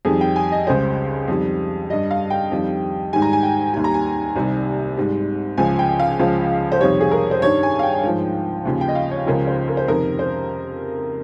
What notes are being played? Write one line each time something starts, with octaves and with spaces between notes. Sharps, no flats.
F2 D#3 G3 G#4
G5
G#5
D#5
C#2 C#3 G3 C5
F2 D#3 G3
G2 G3 D#5
F5
G5
F2 D#3 G3
G#2 D#3 G3 G#5
A#5
G#5
G5
D#2 D#3 G3 G#5
A#5
G#5
C2 C3 D#3 G3
G#2 G3
C#2 C#3 F3 G#5
G5
F5
C#2 C#3 F3
C5
F2 C3 D#3 G3 C#5
G#4
A#4
C5
G2 D#3 G3 C#5
G#5
F5
G5
G#2 F3
D#2 C#3 F3
G5
D#5
F5
C#5
C#2 C#3 F3 A#4
C5
A#4
C5
F2 C3 D#3 A#4
C5